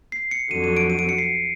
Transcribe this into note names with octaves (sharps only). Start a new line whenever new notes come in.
C7
C#7
F2 D3 F#3 D#7
D#7
D7
D#7
D7
C#7
C7